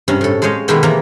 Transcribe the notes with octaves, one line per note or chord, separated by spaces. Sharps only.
G2 C3 C#4
A2 A4
G#3 G#4 C5 C#5 D#5 F5
B2 D#3 G#3 A3 E4 G4
C3 E3 A#3 A#4 A#5